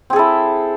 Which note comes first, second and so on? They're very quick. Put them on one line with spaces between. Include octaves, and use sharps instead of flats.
C4 G#4 A4 E4